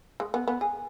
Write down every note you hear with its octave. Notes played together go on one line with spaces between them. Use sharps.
G#3
B3
B3
G#4